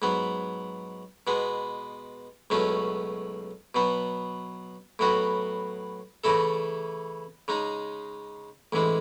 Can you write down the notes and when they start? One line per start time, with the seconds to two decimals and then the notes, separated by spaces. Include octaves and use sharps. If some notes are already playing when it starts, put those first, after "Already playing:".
0.02 G#2 F#3 B3
1.27 B2 G#3 B3
2.50 C#2 B2 F#3 A3 C#4
3.75 B2 F#3 B3
4.99 A2 F#3 B3 F#4
6.24 C#3 E3 A3 E4 A4
7.48 C#3 G#3 D#4
8.72 A1 G#2 E3 G#3